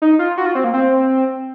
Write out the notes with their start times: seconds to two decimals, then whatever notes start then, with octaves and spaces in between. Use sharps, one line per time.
0.02 D#4
0.19 F4
0.37 F#4
0.46 F4
0.55 C4
0.64 A#3
0.74 C4